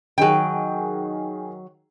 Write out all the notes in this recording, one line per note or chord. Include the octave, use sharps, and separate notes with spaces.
D#3 F#3 G#4 G5